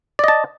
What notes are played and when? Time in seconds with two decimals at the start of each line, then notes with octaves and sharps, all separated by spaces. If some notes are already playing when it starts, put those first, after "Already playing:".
0.19 D5
0.24 D#5
0.28 A5